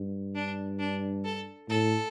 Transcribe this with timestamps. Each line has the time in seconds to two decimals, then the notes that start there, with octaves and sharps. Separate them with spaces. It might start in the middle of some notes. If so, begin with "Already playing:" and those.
Already playing: G2
0.35 D4
0.79 D4
1.24 A4
1.69 A2 A4